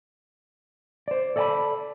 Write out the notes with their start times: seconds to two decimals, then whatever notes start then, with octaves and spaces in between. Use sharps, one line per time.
1.08 C5 D5
1.36 A4 D5 D#5 G#5 A5 B5